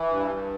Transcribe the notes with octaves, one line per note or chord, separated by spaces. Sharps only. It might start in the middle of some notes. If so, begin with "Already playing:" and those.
Already playing: E3
G2
G2